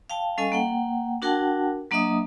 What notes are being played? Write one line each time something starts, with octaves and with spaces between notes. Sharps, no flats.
F5 G5 A5
G3 C#4 A4 D#5 F5 G#5
A#3 F#5 G5
D4 F#4 A#4 F#5 G5 A5
F#3 A#3 D4 D#5 E5 D#6